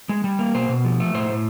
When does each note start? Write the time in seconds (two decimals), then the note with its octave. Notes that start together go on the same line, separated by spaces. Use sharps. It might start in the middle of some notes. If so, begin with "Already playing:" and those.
0.09 G#3
0.24 G3
0.39 A#3
0.54 B2 C5
0.69 B2
0.85 F3
1.00 A3
1.14 A2 C5
1.30 A2